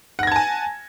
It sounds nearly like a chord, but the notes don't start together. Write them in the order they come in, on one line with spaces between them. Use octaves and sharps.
F#5 A#6 G#6 A5 G#5